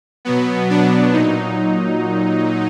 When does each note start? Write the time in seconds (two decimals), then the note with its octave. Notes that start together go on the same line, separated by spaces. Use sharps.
0.25 B2 F#3 B3
0.70 D4
1.13 A#2 F#3 D#4